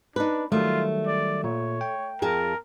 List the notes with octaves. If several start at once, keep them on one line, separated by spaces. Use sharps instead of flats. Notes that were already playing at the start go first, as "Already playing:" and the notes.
D4 D#4 B4
D#3 F#3 G3 A3 F4
D5
A#2 C#5
G5
F2 G#4 A#4 A5